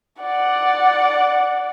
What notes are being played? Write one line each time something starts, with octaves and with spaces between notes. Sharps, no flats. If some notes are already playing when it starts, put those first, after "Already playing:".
D5 F#5